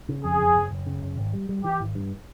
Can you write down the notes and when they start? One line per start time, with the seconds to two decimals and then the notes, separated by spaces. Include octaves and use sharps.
0.09 C#3
0.24 F2 G#4
0.40 F#1
0.55 F#1
0.71 F#1
0.86 C#3
1.02 F#1
1.17 G#1
1.33 G3
1.49 G3
1.64 E3 G4
1.80 G#1
1.95 G2